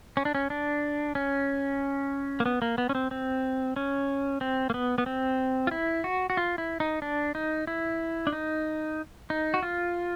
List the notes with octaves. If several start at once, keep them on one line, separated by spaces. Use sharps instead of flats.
C#4
D4
C#4
D4
C#4
A#3
B3
A#3
B3
C#4
C4
C4
C#4
C4
A#3
B3
B3
C4
F4
E4
F#4
F#4
F4
E4
D#4
D4
D#4
E4
D4
D#4
D#4
F#4
F4